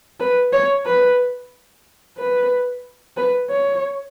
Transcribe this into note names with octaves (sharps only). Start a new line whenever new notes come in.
B4
C#5
B4
B4
B4
C#5